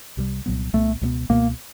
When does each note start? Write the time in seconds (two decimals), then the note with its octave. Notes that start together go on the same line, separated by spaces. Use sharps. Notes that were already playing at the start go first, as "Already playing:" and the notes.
0.17 C2 C3 D#3 G3
0.46 C2 A#2 F#3 B3
0.73 C2 A#2 F#3 A3 B3
1.01 C#2 B2 F#3 B3
1.30 C#2 B2 F#3 A#3 B3